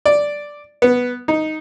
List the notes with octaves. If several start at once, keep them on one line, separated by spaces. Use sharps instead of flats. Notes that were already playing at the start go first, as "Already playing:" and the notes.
D5
B3
D#4